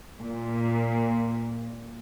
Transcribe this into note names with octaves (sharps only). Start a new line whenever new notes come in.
A#2